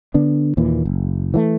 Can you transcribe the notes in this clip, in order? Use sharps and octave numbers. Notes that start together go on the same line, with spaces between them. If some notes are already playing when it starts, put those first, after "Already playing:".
D3 B3 D4
D#2 A#2 E3
F#1
E3 F3 A3